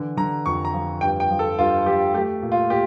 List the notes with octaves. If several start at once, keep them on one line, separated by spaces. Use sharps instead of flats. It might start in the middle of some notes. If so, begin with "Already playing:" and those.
Already playing: D3 E3
D3 A#5
F2 C#6
A#5
F3
G2 G5
G5
F3
A4
G2 F4
F3 G4
A3 G4
A#2
F4
A#2 G4